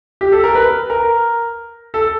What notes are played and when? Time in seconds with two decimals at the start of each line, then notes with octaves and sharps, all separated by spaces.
0.21 G4
0.32 A4
0.44 A#4
0.55 B4
0.90 A#4
1.94 A4